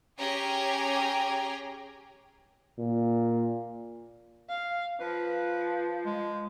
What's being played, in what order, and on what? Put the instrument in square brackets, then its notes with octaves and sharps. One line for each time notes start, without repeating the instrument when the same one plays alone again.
[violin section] C#4 G4 G#4 G5 G#5 A#5
[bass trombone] A#2
[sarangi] F5
[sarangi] F3 [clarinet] B4
[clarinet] G#3